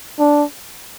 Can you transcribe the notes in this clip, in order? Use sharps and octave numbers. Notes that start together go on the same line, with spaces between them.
D4